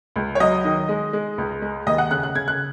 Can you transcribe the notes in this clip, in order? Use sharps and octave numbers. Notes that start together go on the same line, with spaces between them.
C#2
C#5
F#3 D#5
D#3
G#3
G#3
C#2
G#3
D#2 D#5
F#5
C#3 F#6
F#6
C#3 G#6
F#6